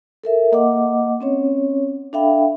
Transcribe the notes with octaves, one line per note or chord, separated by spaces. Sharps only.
A4 A#4 E5
A#3 D#5 F#5 D6
C4 C#4 C#5
D4 A4 E5 F5 G5 B5